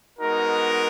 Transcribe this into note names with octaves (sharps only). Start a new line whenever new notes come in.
G#3 B3 D#4 F#4 A#4